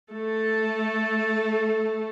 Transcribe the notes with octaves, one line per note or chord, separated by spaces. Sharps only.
A3 A4